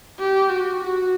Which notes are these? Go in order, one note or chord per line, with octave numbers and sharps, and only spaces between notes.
G4
F#4
F#4